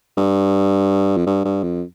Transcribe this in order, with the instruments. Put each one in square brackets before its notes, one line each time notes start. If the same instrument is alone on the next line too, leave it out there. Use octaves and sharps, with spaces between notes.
[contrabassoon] G2
F2
G2
G2
F2